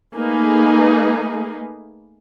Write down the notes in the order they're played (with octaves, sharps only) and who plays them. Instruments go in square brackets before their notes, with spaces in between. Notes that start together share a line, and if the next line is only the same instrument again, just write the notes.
[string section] A3 A#3 D#4 G#4 B4